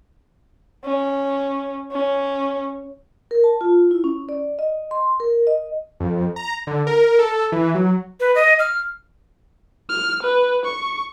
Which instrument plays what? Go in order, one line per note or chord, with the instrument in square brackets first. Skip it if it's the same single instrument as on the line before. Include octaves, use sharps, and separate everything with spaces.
[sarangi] C#4
C#4
[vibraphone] A#4
A5
F4
E4
C#4
D5
D#5
C6
A#4
D#5
[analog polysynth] F2
A#5
D3
A#4
A4
E3
F#3
[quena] B4
D#5
F6
[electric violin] F6
B4
C#6